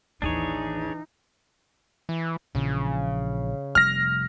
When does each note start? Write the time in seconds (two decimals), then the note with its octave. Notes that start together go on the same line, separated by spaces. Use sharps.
0.22 A1 D#2 E3 D4 D#4 G#4 C#5
2.09 E3
2.55 A#1 C#3 E3 F3
3.75 F1 G3 F6 A#6